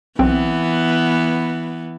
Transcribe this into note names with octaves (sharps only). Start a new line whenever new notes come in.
B1 E3 B3 C4